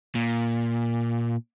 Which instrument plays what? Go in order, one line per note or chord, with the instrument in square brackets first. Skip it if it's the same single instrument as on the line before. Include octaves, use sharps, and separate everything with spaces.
[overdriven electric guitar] A#2